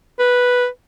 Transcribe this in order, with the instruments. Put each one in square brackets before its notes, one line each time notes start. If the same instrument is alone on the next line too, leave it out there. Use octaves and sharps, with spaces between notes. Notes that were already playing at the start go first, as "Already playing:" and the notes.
[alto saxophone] B4